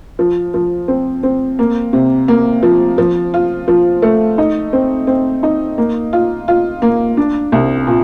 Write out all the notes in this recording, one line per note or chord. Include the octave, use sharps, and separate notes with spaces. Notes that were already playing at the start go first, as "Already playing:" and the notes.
F3
F3
C4
C4
A#3
C3
A#3
F3
F3
F4
F3
A3
D#4
C4
C4
D#4
A#3
F4
F4
A#3
D4
C2
A#2